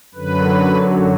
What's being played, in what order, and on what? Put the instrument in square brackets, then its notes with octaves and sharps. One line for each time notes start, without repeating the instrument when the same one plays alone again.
[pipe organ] F#2 D3 F#3 B4